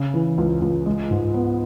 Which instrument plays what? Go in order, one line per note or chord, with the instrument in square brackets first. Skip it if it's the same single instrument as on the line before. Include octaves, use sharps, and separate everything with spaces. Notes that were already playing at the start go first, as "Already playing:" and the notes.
Already playing: [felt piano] C#3
E3
C#2
C#2
G#3
G#2
B3